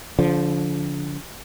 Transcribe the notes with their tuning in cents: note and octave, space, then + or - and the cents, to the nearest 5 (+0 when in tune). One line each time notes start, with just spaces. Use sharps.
D3 -30 F3 +0